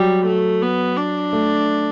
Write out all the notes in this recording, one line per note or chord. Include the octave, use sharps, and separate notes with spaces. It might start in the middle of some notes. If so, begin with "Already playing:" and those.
Already playing: F#3 G3
A3
B3
D4
A3